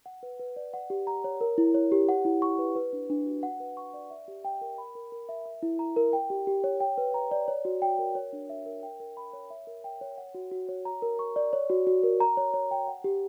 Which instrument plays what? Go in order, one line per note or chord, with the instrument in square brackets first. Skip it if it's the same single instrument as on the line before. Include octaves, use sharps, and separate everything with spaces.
[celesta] F#5
B4
B4
D5
F#5
G4
A#5
C#5
A#4
E4
C#5
G4
F#5
E4
C#6
B4
B4
D4
D4
F#4
F#5
B4
C#6
D5
E5
G4
G5
A#4
B5
A#4
A#4
E5
E5
E4
A#5
A#4
G5
G4
G4
C#5
G5
B4
A#5
D5
C#5
F#4
G5
A#4
C#5
D4
E5
A#4
G5
A#4
B5
C#5
E5
A#4
G5
C#5
F#5
F#4
F#4
C#5
A#5
A#4
C#6
D5
C#5
F#4
F#4
A#4
A#5
C#5
C#5
G5
F#5
G4